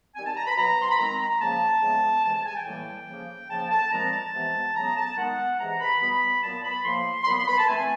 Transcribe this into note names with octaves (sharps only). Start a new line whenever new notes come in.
D#3 G3 C4 G#5
A5
A#5
B5
B2 F#3 B3 A#5
C6
B5
D#3 G#3 C4 A#5
A#5
C#3 F3 A#3 A5
C#3 E3 G#3 B3
C3 E3 G#3 A5
A5
G#5
G5
A2 E3 G3 A#3
C#3 F3 A#3
C#3 F3 A#3 A5
A5
A#2 F3 G#3 C4 A#5
A5
C3 E3 G#3 B3
C#3 F#3 B3 A#5
A5
D#3 G#3 B3 F#5
C3 E3 G#3 A#5
B5
B2 G3 B3 B5
A#2 F#3 B3 A5
B5
A2 F3 A#3 C6
C6
A#2 F#3 B3 B5
C6
B5
A5
E3 A3 C4 G#5